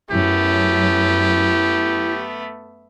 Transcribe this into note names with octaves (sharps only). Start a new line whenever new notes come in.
F#2 A3 B3 E4 G4